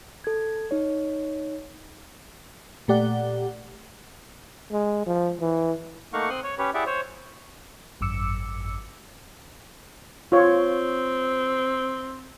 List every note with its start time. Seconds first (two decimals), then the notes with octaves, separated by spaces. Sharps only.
0.24 A4 G#6
0.71 D#4 C#5
2.88 A#2 A3 G4 D5 F#5
4.72 G#3
5.06 F3
5.41 E3
6.13 A3 A#3 D#4 F5 F#5 C#6
6.29 C4 C6 D#6 F#6
6.43 C#5
6.58 C#4 G4 B4 C#5
6.74 E4 G4 G#4 D5 E5 F#5
6.86 C5 C#5
8.01 G#1 F#2 D6 E6 C#7
10.32 C4 F4 C#5